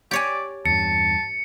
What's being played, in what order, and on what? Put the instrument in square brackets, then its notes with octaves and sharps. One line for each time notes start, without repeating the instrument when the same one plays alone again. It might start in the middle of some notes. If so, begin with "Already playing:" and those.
[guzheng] G4 C#5 G#5 [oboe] D5
[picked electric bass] E2 G2 [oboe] A5 [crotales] C#7